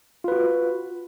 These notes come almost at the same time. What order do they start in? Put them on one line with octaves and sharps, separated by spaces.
F4 B4 F#4